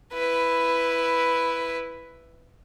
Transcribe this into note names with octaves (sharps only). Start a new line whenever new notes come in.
E4 B4